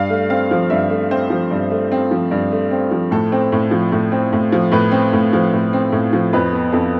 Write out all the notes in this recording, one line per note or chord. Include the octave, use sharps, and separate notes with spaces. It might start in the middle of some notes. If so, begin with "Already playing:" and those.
Already playing: G2 F5
A3
C4 F5
F3
G2 E5
A3
C4 C5
F3
G2
A3
C4
F3
G2
A3
C4
F3
A2 A4
C4
A2
F3
A2
C4
A2
F3
A2 B4
C4
A2
F3
A2
C4
A2
F3
F2 B4
B3
F2 A4